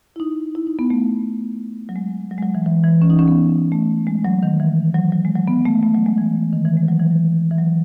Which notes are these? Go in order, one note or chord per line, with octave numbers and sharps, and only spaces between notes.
E4
D#4
E4
D#4
B3
A3
F#3
G#3
F#3
G#3
F#3
E3
E3
E3
C#4
D#4
C#4
B3
A3
G#3
F#3
D#3
E3
F#3
F#3
G#3
F#3
B3
A3
A3
F#3
G#3
E3
D#3
E3
G#3
F#3
E3
F#3
E3
F#3